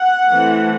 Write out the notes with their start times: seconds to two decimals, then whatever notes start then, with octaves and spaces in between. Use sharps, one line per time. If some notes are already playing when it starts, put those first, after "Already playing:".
Already playing: F#5
0.30 E3 A3 C4